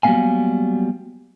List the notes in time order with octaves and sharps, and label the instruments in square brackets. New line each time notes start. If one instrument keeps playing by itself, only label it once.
[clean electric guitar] F#3 G3 A#3 B3 F5 G#5